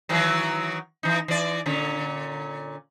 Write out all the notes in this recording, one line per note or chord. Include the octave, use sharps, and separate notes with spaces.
D#3 E3 F#3
E3 D#4
E3 D5
A#2 D3 C#4